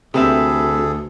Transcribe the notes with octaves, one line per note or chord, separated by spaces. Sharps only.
D2 C3 C4 G#4 A4 B4 E5